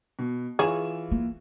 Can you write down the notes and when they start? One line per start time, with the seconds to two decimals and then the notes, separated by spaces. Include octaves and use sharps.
0.19 B2
0.59 E3 F4 G#4 C#5 E7
1.11 A#3